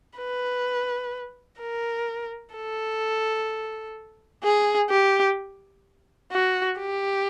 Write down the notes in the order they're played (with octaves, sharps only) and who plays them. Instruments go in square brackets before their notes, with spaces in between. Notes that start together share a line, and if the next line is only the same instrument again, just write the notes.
[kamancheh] B4
A#4
A4
G#4
G4
F#4
G4